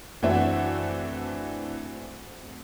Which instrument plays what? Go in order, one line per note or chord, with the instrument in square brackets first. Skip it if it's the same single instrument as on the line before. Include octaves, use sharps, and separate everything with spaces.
[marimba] F#2 [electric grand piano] E3 D4 E5 [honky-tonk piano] A3 C4 F#4 [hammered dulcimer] F#5